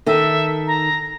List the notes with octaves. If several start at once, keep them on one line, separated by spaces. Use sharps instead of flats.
D#3 A4 E5
A#5